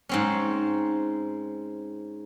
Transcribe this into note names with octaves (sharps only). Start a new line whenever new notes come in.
G#2 C4 C#4